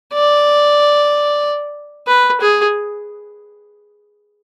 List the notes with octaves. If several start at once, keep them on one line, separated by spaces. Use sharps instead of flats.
D5
B4
G#4